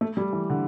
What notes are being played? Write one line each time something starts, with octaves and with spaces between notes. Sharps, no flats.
A3
G3
E3
D3